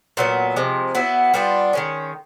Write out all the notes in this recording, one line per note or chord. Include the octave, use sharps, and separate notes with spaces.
A#2 F#3 B3
C3 F3 G#3
F#3 B3 E4
G3 B3 D4 F4
D#3 G#3 C#4